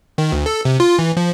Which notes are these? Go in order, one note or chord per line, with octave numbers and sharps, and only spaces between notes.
D#3
D2
A4
C3
F4
E3
F3